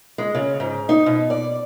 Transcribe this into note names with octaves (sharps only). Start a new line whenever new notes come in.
G#3
C#3
G#2
D#4
B2
D5